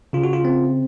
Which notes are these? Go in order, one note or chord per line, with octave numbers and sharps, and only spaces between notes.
C#3 F4
F#4
F4
C4